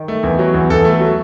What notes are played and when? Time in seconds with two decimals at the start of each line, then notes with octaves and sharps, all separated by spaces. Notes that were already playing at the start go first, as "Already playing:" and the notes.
Already playing: D#3
0.08 A3
0.23 E2
0.39 F#3
0.54 E2
0.70 E2 A4
0.85 A3 A4
1.00 F#3